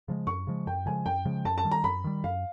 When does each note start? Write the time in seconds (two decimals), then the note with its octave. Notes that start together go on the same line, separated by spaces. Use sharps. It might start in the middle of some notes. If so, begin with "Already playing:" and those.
0.08 C#3 F3 G#3
0.27 F#2 C#6
0.47 C#3 F3 G#3
0.67 F#2 G5
0.86 C#3 F3 G#3 G#5
1.06 F#2 G5
1.25 C#3 F3 G#3
1.45 F#2 A5
1.58 A5
1.65 D#3 G3
1.71 A#5
1.84 F#2 B5
2.04 D#3 G3
2.24 F#2 F5